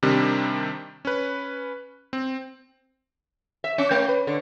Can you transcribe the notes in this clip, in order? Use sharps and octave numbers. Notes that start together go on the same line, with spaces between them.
C3 D#3 G3 C4 D4
C#4 B4
C4
E5
C#4
A3
B4
D3